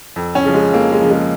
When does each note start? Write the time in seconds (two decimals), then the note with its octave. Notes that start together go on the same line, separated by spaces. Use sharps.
0.16 F2
0.35 C#4
0.45 C#3 F3
0.54 G#3
0.73 F2 A#3
0.92 G#3
1.02 C#3 F3
1.11 G#3